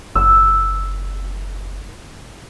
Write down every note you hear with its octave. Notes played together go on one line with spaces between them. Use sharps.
F#1 E6